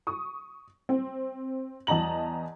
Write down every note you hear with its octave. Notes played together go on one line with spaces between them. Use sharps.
C#6 D#6
C4
E2 D#5 A5 A#5 F#7